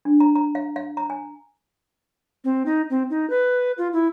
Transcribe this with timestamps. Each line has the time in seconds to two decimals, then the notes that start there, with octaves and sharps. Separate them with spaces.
0.05 D4
0.20 A#5
0.35 A#5
0.55 F5
0.76 F5
0.97 A#5
1.10 G#5
2.44 C4
2.66 D#4
2.90 C4
3.10 D#4
3.30 B4
3.78 F4
3.93 E4